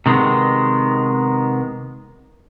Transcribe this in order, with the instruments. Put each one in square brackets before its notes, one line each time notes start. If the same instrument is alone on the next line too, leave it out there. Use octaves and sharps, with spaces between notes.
[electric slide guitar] C3 D#3 G#3 B3